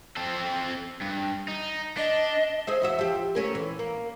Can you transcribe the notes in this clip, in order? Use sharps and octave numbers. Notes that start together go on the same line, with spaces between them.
C4 A4
G2
D#4
D4 D#5
G#4 C5 E5
E2 F#4 E5
F3 G4
A3 C#4 A#4
E3
A#3